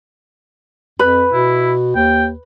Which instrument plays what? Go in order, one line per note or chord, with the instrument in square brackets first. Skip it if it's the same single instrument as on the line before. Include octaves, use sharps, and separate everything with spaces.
[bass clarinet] F2 [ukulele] B4 B5
[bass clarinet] B2 [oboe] E4
[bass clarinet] D#2 [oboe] G5